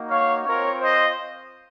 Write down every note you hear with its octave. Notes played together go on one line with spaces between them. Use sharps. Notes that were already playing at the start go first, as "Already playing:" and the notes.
Already playing: A#3 D#4 F#4
C#5 F5
C4 F4 A#4 C#5
C5 D#5